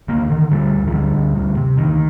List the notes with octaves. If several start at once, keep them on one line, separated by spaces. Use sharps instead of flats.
D2 A#3
D3 D#3
D2 G3
D2
F3
D3 G3
D2
D2
C3
D2 D#3